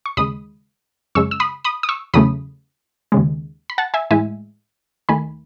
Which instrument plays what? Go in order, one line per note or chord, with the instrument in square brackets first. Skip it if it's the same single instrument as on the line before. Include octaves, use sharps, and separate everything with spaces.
[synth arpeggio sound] C#6
D#2 C#3 G#3 B5 D#6
F#2 C#3 G#3 C#6 E6
E6
B5 D#6
B5 D#6
D#6
C#6 E6
E2 C#3 F#3 A3 B5 D#6
D#2 C#3 G#3
B5
F#5 A5
E5 G#5
A2 E3 G#3 E5 G#5
D#2 D#3 A3 G#5 B5